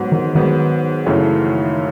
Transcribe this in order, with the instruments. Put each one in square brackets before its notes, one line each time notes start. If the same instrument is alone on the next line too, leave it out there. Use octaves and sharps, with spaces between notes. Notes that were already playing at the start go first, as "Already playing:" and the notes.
Already playing: [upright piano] G#2 F#3 B3
[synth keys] D#3
[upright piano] G#2 F#3 B3 [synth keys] D#3
[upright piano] F#2 C#3 E3 A3 C#4